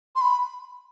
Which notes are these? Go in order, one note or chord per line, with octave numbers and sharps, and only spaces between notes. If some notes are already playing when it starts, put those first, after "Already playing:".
C6
B5